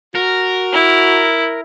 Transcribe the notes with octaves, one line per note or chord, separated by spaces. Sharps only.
F#4 A#4
E4